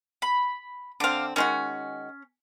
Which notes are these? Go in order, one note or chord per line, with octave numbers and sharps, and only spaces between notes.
B5
D3 C4 F5 D6
D#3 G#3 C#4 F#4